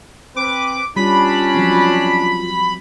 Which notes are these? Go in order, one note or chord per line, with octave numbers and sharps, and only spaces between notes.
C4 B4 D6
G3 C#4 D4 F4 B5
F3 F#3 C4